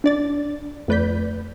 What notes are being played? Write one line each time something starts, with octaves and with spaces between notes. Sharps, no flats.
D4 D5 A6
F2 A3 B4 D5 G6 B6